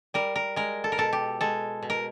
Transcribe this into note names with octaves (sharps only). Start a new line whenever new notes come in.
G3 A#4
A#4
G#3 A#4
A4
A#4
B2 A4
G4
G#3 A4
B2
A#4